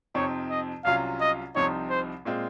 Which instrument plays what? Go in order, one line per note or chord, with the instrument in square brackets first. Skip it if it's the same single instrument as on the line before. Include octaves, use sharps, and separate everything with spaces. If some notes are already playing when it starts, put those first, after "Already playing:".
[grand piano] F2 C3 F3 C4 D#4 [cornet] C#5
[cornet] D#5
[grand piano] C2 C3 F#3 C#4 F4 [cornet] F5
[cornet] D#5
[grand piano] C2 C3 F3 C4 D#4 [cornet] C#5
[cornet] C5
[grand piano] A#2 G#3 C4 F4